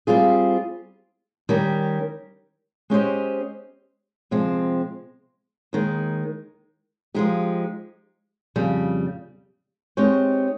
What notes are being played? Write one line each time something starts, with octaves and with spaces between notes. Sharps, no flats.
G3 C4 F4 G#4
D#3 G3 C#4 G4 A#4
G#3 C#4 G4 C5 D#5
C3 F3 G#3 C4
D#2 D#3 G#3
F3 G#3 D#4 G4
F2 C#3 G3
G#3 C4 D#4 G4 C#5